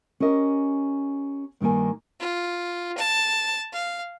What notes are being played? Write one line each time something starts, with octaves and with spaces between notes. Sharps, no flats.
C#4 G4 A#4 D#5
G2 D#3 G3 A#3 G#5
F4
A5
F5